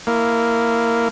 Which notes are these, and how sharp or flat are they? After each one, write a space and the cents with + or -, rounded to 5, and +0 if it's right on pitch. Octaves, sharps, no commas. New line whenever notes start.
A#3 -5 E4 +0